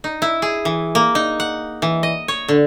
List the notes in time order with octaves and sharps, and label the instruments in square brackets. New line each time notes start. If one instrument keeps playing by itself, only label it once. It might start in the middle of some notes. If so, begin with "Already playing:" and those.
[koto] D#4
E4
G#4
E3
A#3
D#4
F#5
E3
D#5
C#5
D3